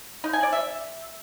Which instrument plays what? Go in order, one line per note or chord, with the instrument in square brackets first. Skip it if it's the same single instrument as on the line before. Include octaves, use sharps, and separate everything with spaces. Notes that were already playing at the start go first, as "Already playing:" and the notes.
[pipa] D#4
G#5
D5
E5